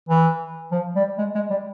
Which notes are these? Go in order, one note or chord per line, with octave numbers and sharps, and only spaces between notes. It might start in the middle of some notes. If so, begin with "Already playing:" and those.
E3
F3
G3
G#3
G#3
G3